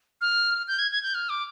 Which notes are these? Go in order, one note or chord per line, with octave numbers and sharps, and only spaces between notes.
F6
G6
G#6
G#6
G6
F6
D6